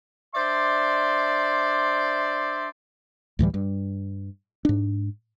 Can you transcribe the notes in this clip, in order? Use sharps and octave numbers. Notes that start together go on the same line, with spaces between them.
D4 C5 D5 E5 C6
D2 A2 E3 G3
G2
G#2 D4